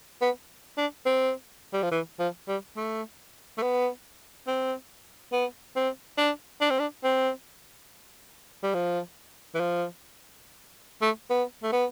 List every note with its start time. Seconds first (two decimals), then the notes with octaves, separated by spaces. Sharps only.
0.21 B3
0.78 D4
1.06 C4
1.73 G3
1.83 F3
1.92 E3
2.19 F3
2.48 G3
2.77 A3
3.58 A3
3.62 B3
4.47 C4
5.33 B3
5.76 C4
6.18 D4
6.61 D4
6.70 C4
6.79 D4
7.04 C4
8.63 G3
8.74 F3
9.55 E3
9.60 F3
11.02 A3
11.30 B3
11.63 A3
11.72 B3